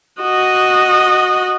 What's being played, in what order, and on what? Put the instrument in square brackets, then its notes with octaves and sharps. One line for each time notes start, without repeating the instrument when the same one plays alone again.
[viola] F#4 D#5